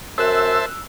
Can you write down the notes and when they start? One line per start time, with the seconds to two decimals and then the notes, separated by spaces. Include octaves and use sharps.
0.18 F#2 C5 E5 A5 E6 F#6